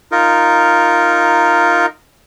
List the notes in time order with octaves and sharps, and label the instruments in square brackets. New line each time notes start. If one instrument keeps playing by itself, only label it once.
[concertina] D#4 F4 A#4